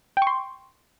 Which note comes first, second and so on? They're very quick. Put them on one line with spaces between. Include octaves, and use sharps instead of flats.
G5 C#6 C6